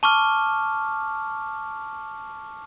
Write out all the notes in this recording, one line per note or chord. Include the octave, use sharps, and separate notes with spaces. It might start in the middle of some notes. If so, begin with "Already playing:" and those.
A5 C#6 D6 F6